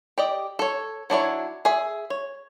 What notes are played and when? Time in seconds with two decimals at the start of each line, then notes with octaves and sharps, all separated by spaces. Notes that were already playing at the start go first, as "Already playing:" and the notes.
0.18 G4 D5 D#5
0.59 A4 C#5
1.10 F#3 D4 E4 C#5
1.65 G#4 E5
2.10 C#5